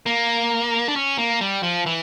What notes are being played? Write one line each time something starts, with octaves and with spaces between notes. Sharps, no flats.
A#3
D4
C#4
A#3
G3
F3
E3